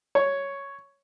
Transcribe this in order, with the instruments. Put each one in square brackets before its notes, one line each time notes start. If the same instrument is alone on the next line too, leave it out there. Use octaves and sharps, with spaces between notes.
[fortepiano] C#5